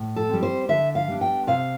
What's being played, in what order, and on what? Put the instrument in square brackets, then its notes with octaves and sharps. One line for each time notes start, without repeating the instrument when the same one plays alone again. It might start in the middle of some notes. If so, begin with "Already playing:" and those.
Already playing: [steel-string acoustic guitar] A2
A4
G3 C4
C5
D3 E5
F5
G3 B3 D4
G5
C3 F5